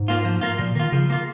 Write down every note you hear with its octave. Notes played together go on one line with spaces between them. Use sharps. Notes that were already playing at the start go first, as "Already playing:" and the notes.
Already playing: G#2
A#3 F4
F3
A#3 F4
A#2 F3
D#3 A#3 F4
C#3 F3
A#3 F4